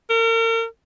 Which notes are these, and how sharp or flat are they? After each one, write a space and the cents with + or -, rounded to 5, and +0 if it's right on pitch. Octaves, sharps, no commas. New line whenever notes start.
A#4 -40